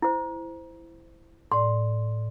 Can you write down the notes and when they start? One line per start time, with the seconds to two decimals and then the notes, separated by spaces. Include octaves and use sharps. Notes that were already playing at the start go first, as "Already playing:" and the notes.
0.02 E4 C5
1.52 A2 D5 C6